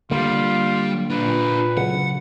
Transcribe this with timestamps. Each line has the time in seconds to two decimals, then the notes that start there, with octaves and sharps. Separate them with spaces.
0.11 D3 G3 A#3 F4
1.10 A#2 D4 F4 B4
1.77 C#3 F#3 F#5